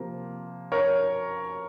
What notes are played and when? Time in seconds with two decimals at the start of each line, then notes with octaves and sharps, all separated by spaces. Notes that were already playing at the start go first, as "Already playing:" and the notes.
Already playing: C3 F3 A#3
0.72 A#4 C#5